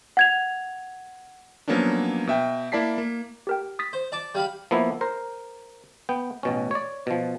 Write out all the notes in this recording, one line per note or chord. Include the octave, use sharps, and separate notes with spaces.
F#5 G#6 F7
F3 F#3 A#3 B3 C#4 D4
B2 E5 G5
A#3 E4 D5 A5 B6 C7
A#3
G4 A#4 G5
D#6 A6 B6
C5
D5 A5 D6
G3 F5 B5
F3 A#3 B3 E4
A#4 C5
B3 G5
A1 B2 C#4
C#5 D5
B2 F3